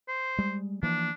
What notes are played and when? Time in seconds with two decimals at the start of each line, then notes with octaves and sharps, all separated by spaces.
0.08 C5
0.38 G3 G#3
0.83 E3 F3 A#3 D4